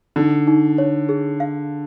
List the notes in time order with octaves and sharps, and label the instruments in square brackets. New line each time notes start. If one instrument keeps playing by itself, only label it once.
[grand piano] D3 [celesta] D#4
[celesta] D#4
C#5
G#4
F5